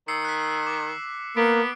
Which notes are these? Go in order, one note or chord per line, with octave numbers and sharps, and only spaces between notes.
D#3 E6 C7 C#7
F#6 B6
D6
A#3 B3 D7